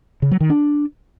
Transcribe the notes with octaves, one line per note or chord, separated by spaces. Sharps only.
C#3
F#3
D#3
D4